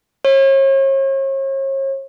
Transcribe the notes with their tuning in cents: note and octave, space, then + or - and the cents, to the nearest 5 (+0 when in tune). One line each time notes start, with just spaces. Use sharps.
C#5 -40